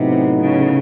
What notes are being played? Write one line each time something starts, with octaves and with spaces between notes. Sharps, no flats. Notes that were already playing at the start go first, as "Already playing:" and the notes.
Already playing: A2 C3 F#3 B3 D#4
C#3